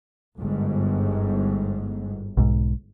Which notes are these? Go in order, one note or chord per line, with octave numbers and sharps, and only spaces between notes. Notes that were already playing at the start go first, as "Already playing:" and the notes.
G1 G#2
B1 G#2